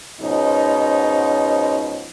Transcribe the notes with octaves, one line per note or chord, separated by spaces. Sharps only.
G#2 B2 F3 C#4 D#4